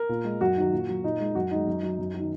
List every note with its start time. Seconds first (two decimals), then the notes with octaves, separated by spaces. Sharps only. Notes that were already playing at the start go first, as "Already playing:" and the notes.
Already playing: A#4
0.09 A#2
0.25 G#3
0.41 F#2 F#4
0.57 D#3 F#3
0.72 A#2
0.89 F#3
1.03 A#2 D#4
1.20 G#3
1.35 F#2 F#4
1.51 D#3 G#3 D#4
1.67 F#2
1.83 F#3
1.99 F#2
2.15 D#3 F#3